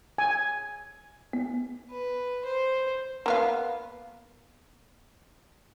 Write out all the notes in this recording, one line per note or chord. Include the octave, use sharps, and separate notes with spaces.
G#5
B3
B4
C5
A#3 B3 F5